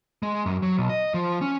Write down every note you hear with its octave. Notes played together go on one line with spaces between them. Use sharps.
G#3
F#2
F#3
B1
D#5
F3
C#4